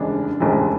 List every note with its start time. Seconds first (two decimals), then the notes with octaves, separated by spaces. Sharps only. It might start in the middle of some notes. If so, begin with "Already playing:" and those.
Already playing: F1 D#2 C#3 E3 G#3 D4
0.40 F1 D#2 C#3 E3 G#3